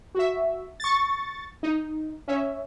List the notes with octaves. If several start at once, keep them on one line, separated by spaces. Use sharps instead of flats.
F#4 E5
C#6 A6
D#4
C#4 E5